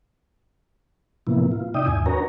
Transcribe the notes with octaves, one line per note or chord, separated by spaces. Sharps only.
A2 C3 F3 A#3 B3 E4
F4
C3 D#4 D5 E5 G5 D#6
D#2 G#2 G#5
D4 F#4 A#4 B4 C#5 A#5